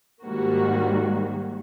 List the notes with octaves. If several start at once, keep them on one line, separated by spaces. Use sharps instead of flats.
G#2 D#3 G3 A#3 F#4